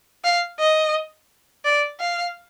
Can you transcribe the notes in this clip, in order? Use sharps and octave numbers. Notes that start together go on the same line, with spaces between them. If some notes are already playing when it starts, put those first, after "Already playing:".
F5
D#5
D5
F5